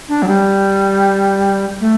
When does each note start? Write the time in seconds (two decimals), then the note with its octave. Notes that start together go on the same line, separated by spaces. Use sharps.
0.09 D4
0.22 F#3
0.28 G3
1.81 A3